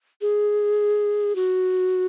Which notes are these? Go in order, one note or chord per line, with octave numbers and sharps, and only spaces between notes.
G#4
F#4